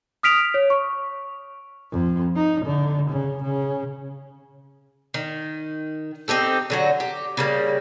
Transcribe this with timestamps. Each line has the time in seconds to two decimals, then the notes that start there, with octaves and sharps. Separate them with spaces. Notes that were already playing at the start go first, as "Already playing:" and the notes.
0.23 D#6 F6 B6 D7 F7
0.54 C#5
0.70 C#6
1.92 F2
2.36 D#4
2.65 D3
3.10 C#3
3.43 C#3
5.14 D#3
6.28 C4 D#4 G4 A4
6.70 D3 F#3 F#4
7.00 G4
7.37 C#3 G3 A#3